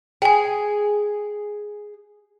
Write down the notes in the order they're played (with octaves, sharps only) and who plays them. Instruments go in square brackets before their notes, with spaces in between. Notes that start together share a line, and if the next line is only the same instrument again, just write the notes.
[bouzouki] G#4 [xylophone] G5 G#5